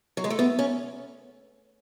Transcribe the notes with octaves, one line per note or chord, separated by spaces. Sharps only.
F#3
G#3
A3
B3
C#4